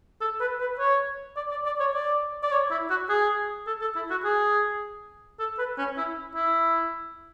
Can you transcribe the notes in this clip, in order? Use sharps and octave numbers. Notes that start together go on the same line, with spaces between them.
A4
B4
B4
C#5
D5
D5
D5
C#5
D5
D5
C#5
E4
F#4
G#4
A4
A4
E4
F#4
G#4
A4
B4
C#4
E4
E4